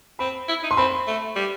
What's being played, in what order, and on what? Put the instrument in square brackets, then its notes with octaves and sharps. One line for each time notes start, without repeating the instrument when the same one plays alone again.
[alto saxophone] C4 [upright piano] B5
[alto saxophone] E4
D#4
[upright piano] C6
[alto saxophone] C4 [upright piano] B5
[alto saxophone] A3
G3